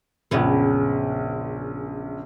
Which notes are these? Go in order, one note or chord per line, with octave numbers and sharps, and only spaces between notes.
A#1 F#2 C#3 B3